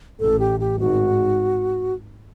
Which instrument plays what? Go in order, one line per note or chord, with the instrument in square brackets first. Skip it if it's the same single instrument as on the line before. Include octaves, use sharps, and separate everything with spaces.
[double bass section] A1 A2 [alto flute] A4
[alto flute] G4
G4
[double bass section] G#1 G#2 [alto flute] F#4